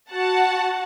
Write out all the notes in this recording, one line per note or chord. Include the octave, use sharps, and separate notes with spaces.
F#4 F#5 A5